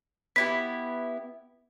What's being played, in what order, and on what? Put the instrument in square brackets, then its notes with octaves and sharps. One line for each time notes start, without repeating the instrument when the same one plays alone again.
[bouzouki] B3 E4 G4 [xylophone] B6